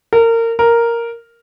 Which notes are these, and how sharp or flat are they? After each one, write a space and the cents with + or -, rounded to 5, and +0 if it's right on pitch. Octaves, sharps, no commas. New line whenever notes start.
A#4 -25
A#4 +0